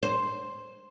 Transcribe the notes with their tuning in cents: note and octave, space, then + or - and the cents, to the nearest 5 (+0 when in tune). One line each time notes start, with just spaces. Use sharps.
C5 +0